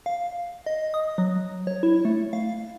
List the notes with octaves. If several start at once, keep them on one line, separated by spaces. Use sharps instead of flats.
F5
D#5
D#6
F#3
C#5
E4
A3
F5